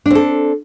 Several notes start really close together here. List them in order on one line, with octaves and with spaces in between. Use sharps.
D4 C4 A4